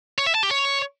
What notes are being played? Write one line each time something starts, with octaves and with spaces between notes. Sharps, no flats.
C#5
E5
A5
G4
C#5